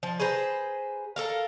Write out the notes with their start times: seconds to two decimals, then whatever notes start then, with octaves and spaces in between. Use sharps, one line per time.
0.03 F3
0.20 G#4 B4 C5 A#5
1.16 A4 A#4 F5